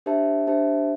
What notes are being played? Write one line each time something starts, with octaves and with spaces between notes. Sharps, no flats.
D4 G4 C5 E5 A5
D4 G4 C5 E5 A5